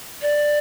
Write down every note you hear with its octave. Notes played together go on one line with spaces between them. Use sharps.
D5